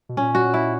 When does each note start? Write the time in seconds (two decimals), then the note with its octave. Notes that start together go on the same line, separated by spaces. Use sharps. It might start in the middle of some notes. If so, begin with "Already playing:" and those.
0.09 B2
0.17 A#2 C#4
0.35 F#4
0.54 E4